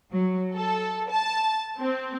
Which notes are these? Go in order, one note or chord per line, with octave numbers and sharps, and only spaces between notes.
F#3
A4
A5
C4